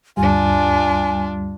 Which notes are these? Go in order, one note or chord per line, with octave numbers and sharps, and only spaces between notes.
D2 G2 G3 D4 F4 G#5